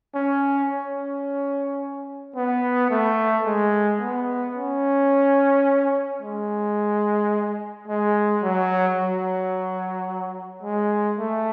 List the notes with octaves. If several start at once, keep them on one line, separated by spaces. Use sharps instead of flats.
C#4
C#4
B3
A3
G#3
B3
C#4
G#3
G#3
F#3
F#3
G#3
A3